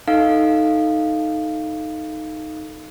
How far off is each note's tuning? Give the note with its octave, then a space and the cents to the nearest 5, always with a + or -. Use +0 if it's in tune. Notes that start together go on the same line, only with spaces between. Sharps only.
D#4 +0 A4 +0 F5 -10